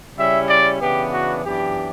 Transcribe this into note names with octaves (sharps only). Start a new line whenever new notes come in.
C#3 G3 C#4 E4 E5
D5
C#3 E3 B3 D4 G4
F#4
F#2 E3 B3 D4 G4